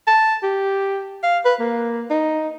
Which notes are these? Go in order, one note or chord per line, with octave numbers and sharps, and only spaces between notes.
A5
G4
F5
B4
A#3
D#4